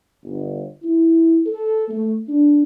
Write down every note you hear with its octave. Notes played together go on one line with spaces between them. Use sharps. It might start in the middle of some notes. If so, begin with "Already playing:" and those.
G1
E4
A4
A3
D4